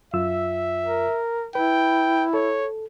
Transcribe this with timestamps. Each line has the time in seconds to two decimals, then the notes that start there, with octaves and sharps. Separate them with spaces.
0.14 F#2 F4 E5 E6
0.85 A#4
1.55 E4 B4 G5
2.34 A4 C#5